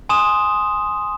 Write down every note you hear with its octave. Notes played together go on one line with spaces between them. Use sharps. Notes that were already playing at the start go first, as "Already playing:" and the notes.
G#5 C6 D#6 E7